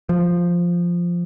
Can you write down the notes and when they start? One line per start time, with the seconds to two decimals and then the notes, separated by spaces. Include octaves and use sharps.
0.09 F3